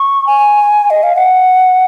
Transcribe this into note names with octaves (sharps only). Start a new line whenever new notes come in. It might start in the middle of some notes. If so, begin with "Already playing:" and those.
Already playing: C#6
G#5
D#5
F5
F#5